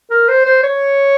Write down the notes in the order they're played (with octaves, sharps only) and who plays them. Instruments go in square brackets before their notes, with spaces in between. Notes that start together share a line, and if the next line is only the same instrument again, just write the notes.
[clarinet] A#4
C5
C5
C#5